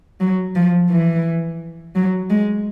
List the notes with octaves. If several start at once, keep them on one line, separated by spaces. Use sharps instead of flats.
F#3
F3
E3
F#3
G#3